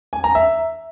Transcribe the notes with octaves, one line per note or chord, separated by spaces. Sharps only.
G#5
A#5
E5